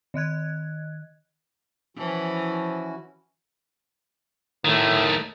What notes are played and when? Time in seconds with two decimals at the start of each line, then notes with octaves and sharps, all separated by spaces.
0.14 D#3 D#5 F#6 G#6
1.97 E3 F3 C#4 E4 F#4
4.65 A2 D#3 A3